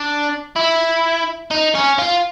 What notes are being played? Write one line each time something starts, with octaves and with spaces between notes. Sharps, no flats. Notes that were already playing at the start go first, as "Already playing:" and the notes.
Already playing: D4
E4
D#4
C#4
F4